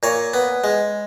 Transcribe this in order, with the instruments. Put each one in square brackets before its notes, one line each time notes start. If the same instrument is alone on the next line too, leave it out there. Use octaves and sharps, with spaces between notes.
[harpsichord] A#2 C#5
B3
G#3